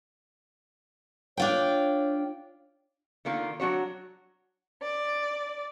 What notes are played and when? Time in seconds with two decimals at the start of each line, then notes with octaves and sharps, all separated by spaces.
1.37 D4 F4 C#5 G5
3.25 D3 D#3 A#3 F4
3.60 F#3 D4 F#4 C#5
4.81 D5